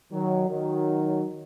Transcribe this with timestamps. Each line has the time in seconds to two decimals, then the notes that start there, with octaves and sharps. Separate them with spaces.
0.12 D#3 F#3
0.48 D#3 F#3